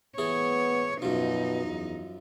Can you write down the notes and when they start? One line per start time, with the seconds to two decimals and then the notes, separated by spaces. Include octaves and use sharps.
0.18 E3 B3 G#4 C#5
1.02 F#2 B2 F3 D#4
1.65 E2